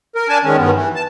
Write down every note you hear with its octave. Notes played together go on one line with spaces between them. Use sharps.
A#4
D4 G#5 A5
D#3 G#3 C#4
G2 D#3 B3
E3
A5